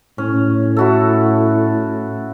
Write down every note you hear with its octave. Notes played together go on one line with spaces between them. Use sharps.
A2 C#4
E4 F#4 A4